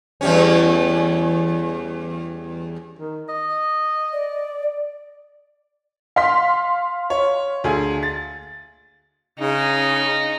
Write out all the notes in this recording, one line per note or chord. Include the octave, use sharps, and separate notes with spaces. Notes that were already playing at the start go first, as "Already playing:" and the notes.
E2 G3 C#4
D#3
D#5
D5
F5 C6 B6
C#5
D2 G#4 G#5
A6
C#3 D#4